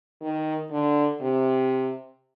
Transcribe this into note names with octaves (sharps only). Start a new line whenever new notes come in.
D#3
D3
C3